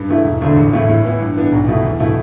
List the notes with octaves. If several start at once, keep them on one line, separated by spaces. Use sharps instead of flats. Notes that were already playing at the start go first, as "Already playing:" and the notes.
Already playing: G2
E3 A3 E4
E1
D2 D3 A3 D4
A1
A2 A3 E4
A2
E3 B3 E4
G2
E3 B3 D4
B1
B2 A3 E4
E2
B2 A3 E4